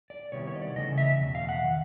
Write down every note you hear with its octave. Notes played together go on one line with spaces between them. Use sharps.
D5
C3 D#3 G3 B3 E4 C#5
C#5
D#5
D5
C#3 E3 A3 D#5
E5
E2 B2
F5
F#5
D#3